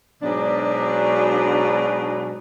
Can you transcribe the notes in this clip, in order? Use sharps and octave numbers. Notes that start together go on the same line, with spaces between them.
G#2 B2 F#3 D4